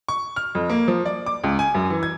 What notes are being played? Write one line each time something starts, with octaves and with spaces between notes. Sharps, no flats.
C#6
F6
F2
A#3
F3
D5
D6
C#2
G#5
F#2
E3
G#6